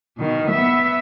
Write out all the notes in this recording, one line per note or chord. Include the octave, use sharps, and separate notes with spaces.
B2 D#3
B3 E5